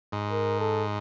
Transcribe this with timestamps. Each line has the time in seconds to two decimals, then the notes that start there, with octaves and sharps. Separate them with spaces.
0.12 G#2
0.31 A#4
0.60 A4